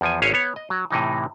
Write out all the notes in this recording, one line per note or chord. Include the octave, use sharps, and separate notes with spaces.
E2 F3 G#5
G#1 C#4 C5 C#5 F5 G#5
B3 C#5
D#5
F#3
A2 C3 E3 D#4